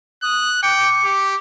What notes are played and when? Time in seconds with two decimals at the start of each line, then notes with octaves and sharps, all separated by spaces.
0.23 D#6 F#6
0.63 G5 D6 C#7
1.04 G4